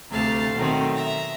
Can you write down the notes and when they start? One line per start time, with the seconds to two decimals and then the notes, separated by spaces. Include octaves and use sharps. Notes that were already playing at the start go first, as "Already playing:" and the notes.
0.11 D2 C3 A3 F5 A5
0.55 B2 D#3 F#3 A3 C4
0.93 E5 A#5